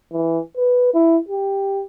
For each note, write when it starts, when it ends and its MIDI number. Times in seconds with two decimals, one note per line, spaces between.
0.12 0.40 52
0.57 0.90 71
0.94 1.18 64
1.28 1.85 67